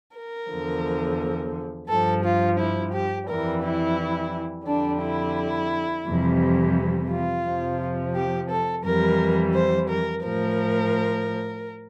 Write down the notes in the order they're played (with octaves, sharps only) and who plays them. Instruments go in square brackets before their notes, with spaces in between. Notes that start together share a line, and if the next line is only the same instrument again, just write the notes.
[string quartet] A#4
E2 D3 F3
G2 F3 A4
F4
E4
G4
F2 E3 G3 A#4
E4
F2 D3 G3 D4
E4
F2 C3 E3 G3
F4
F2 C3 F3
G4
A4
F2 E3 G3 A#4
C5
A#4
A2 F3 A#4